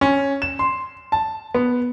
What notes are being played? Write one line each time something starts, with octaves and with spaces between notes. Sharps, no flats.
C#4
E7
C6
A5
B3